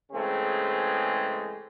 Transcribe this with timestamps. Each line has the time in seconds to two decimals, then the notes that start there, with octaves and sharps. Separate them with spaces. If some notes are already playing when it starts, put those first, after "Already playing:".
0.12 C#3 E3 G#3 A3 C4 G#4